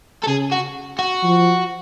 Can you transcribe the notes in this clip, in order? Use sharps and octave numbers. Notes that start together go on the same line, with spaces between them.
A4
C#3 G#4
F#4
F#4
F3